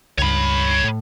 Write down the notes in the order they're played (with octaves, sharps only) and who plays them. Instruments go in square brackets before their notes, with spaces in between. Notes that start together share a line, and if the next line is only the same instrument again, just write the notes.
[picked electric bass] C#2 G2 [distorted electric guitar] C#5 B5
[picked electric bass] A2